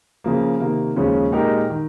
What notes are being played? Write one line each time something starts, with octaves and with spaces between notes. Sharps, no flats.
C#3 F3 A#3
C3 D#3 A#3
D#2 C#3 F3 G#3 C#4
A#2 G#3 D#4 G4 A#4
D#3